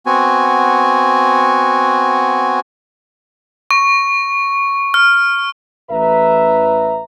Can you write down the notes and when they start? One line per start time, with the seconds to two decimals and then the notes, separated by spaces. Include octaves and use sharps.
0.06 B3 C4 F#4 G#5
3.71 C#6
4.94 F6
5.90 A1 B4 E5 A#5